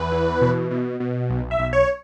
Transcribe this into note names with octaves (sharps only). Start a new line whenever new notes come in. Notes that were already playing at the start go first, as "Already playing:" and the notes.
Already playing: E2 B4
E3
B2
B2
B2
B1
E5
B1
C#5